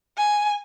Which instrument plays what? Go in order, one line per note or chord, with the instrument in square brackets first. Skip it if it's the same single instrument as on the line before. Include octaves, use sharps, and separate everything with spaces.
[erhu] G#5